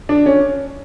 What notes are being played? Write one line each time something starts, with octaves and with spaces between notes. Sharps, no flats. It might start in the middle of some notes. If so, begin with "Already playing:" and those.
D4
C#4